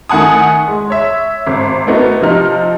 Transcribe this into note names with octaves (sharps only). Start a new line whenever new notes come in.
D#3 A3 F#5 G#5 D#6
G#3
C#5 E5
G#1
A3 B3 D#4 F#4 A#4
C3 F3 D#4 F6